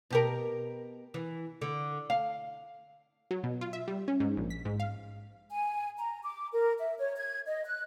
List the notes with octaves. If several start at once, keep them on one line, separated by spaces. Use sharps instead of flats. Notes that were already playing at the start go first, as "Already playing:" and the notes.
B2 G4 A#4
E3
D3
F5
F#3
B2
F4
E5
G3
C#4
G#2
A#1
B6
G#2
F5
G#5
A#5
D6
A#4
E5
C#5
G#6
D#5
F#6